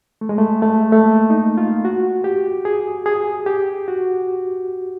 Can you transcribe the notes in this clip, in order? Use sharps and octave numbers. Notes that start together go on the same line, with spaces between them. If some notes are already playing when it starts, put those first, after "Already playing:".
A3
G#3
A3
A3
A3
A#3
D#4
F4
F#4
G4
G#4
G#4
G4
F#4